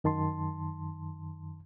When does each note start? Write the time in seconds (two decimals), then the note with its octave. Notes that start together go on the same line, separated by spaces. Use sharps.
0.04 F#2 D#3 A5 C6